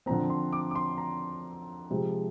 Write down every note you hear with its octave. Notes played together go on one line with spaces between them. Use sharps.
D3 F3 C4 A#5
C6
D6
D6
C6
A#5
C3 F3 G#3 C4